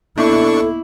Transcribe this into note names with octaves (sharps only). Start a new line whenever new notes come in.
A#3 B3 D4 E4 A4 C#6